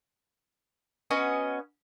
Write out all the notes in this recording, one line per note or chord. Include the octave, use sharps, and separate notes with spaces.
B3 C#4 F#4 D#5